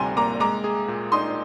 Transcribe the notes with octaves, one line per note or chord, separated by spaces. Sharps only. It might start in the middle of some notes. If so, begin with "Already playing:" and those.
Already playing: D2 C3 G3 G#5 A#5 C6
A#3 A#5 D6
G#3 A#5 D6
G#4
A#2
D#4 C6 D#6